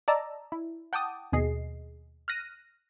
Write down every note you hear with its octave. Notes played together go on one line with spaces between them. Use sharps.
D5 D#5 A5 A#5 E6
E4
F#5 G5 A5 D6 D#6
D#2 B2 G#4 D#5 C7
F6 F#6 A#6 D#7